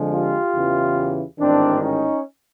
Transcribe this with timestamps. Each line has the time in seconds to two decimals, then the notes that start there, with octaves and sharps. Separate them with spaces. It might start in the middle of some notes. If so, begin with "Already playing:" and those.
Already playing: F2 D3 F3 G#3
0.10 F4 G4
0.53 E2 C#3 E3
1.39 A1 G#2 D#3 C4 D4
1.82 C#4 D#4